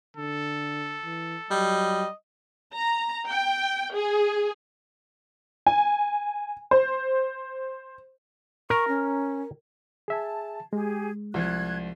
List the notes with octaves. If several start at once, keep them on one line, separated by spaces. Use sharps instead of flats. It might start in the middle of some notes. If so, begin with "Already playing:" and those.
D3 A4
E3
F#3 G3 D#5
A#5
G5
G#4
G#5
C5
A#4 C#6
C#4
G#4 E5 G#5 A5
G#3 G4 G#4
C2 F3 F#6 G#6